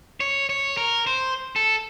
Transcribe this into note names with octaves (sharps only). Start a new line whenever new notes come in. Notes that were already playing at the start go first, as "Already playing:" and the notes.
C#5
C#5
A#4
C5
A4